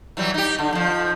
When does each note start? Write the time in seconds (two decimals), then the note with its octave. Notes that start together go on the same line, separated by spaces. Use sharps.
0.17 E3 F#3 G3
0.34 D#4 G4
0.58 D3
0.73 F2 F3